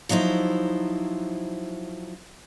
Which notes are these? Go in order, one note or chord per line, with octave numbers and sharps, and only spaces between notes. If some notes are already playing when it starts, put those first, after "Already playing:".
F3 F#3 D#4 E4 C5